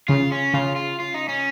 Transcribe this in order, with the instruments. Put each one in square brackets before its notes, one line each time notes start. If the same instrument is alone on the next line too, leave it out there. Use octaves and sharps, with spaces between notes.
[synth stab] C#3 [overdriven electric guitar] F4
[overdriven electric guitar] C#4
[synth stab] C#3 [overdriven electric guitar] F4
[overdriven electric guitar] F4
F4
D#4
C#4